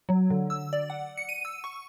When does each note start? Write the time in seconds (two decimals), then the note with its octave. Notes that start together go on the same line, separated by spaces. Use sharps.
0.09 F#3
0.30 D3
0.50 E6
0.73 D5
0.90 F#5
1.17 C#7
1.29 D#7
1.45 E6
1.64 C#6